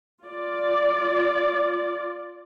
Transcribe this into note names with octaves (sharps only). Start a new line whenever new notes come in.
F4 D5